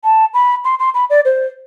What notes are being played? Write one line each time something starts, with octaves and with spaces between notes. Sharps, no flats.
A5
B5
C6
C6
B5
D5
C5